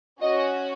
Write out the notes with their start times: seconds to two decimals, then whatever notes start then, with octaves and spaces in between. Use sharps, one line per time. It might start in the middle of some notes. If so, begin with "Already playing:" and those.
0.21 C#4 F#4 D#5